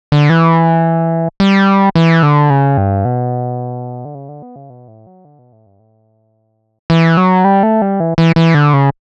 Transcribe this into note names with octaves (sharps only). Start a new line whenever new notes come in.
D3
E3
G3
E3
D3
C#3
G2
B2
D3
C#3
D3
B3
C#3
B2
A2
F#3
D3
B2
A2
G2
A2
E3
F#3
G3
A3
G3
E3
E3
E3
D3
C#3